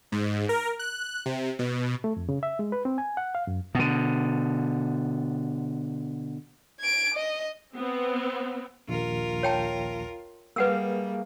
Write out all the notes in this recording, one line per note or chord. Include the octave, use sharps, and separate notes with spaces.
G#2
A#4
F#6
C3
B2
A3
F2
C#3
E5
G#3
B4
C4
G#5
F#5
F5
F#2
B2 D3
G#6 D7
D#5
B3 C4
A#1 D#2 F4 A#4
C#5 G5 A5
G3 A#3 G#4 B4 F5 F#5 E6